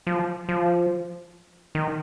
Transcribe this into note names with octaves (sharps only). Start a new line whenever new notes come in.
F3
F3
D#3